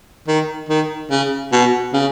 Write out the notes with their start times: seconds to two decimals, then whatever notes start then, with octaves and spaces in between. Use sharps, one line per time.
0.28 D#3
0.69 D#3
1.10 C#3
1.52 B2
1.93 C#3